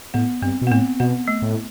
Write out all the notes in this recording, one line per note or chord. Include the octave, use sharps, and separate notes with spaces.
A2 B3
G2 C4
B2
B3
A2 C4
B2 B3
A3
A2